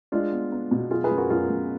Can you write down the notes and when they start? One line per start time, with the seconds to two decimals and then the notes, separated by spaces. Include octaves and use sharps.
0.12 G#3 D4 F4
0.32 B3
0.52 B3
0.71 B2
0.91 F#3 F4 G#4
1.04 G#4 B4
1.11 F#2
1.17 F#4 A#4
1.30 F#2 F4 G#4
1.50 F#2